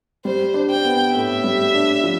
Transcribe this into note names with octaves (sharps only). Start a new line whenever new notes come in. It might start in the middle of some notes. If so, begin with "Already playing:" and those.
G3 C5
D4
G5
B3
A2 E5
G3
D4
F3